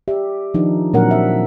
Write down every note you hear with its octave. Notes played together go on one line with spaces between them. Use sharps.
G4 D5 E5
D#3 F3 D4 D#4
A#2 F#3 C4 D4 A#4 F#5
E5